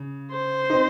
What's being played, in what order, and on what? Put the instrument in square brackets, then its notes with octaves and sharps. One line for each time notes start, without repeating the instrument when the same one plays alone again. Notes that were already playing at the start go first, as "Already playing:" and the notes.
Already playing: [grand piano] C#3
[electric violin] C5
[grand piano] C4 D#4